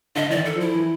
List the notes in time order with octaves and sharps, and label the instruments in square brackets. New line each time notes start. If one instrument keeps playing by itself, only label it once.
[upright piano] D3 [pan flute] D#5
[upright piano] E3 [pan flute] D5
[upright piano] D#3
[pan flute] A4
[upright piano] F3
[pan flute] E4
[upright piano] E3